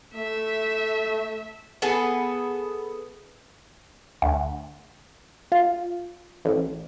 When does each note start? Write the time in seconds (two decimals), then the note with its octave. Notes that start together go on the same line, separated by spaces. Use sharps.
0.15 A3 E5
1.82 B3 G#4 A4
4.22 D2
5.52 F4
6.45 A1